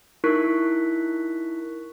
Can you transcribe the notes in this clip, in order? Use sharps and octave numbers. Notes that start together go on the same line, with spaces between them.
D#4 E4 A#4 C#6 F#6 B6